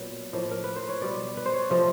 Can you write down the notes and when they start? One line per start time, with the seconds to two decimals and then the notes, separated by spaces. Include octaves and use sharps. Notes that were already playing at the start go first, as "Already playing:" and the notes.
Already playing: A#2 F#3 B3
0.33 A2 F3 A#3 D#5
0.51 A#4
0.64 B4
0.76 C5
0.89 C#5
1.01 B2 G3 B3 D5
1.37 B4
1.46 C5
1.53 C#5
1.62 D5
1.70 C3 F3 A3 C4 D#5